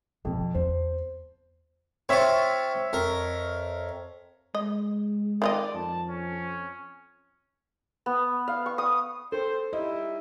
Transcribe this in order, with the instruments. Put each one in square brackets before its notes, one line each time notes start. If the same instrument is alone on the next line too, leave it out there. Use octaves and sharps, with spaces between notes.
[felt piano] F2 [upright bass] B2 D#3
[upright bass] E2 [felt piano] C5
[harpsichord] C4 F4 [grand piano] C#5 E5 C#6
[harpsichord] F2 A#4
[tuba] G#3 [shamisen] D#5
[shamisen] D#3 F4 D#5 [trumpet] D5
[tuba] F2 [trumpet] A5
[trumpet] C#4
[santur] B3
F5
C#6
D#6
[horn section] C4 C5 [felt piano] A4
[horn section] G3 D#4 E4 [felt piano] D#5